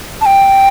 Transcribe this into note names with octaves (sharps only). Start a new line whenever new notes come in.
A5
G5